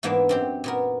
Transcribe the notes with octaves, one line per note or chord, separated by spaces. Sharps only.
G#2 E3 A#3 B3 D4 E5
F#2 C4 G4
A#2 B3 A#4